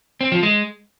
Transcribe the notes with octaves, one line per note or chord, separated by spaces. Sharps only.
C4
F3
G#3